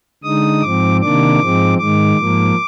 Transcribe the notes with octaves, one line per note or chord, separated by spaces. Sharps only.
D3 G#3 D#4 D#6
G#2 F3 C4 D6
C3 D#3 A#3 D4 D6
G#2 F3 G#3 C4
G#2 D#3 G#3 D6
G#2 F3 A#3